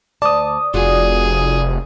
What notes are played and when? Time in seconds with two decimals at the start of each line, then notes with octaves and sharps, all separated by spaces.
0.22 D2 D5 A5 D#6
0.74 F1 F4 F#4 G#4